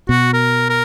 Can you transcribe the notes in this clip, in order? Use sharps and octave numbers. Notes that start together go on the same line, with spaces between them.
B2 F#4
A#4
A#4